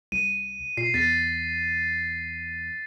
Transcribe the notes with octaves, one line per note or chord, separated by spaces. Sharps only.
C2 D#7
A#2 C7
E2 A6 B6